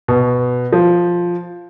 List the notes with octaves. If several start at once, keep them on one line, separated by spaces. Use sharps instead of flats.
B2
F3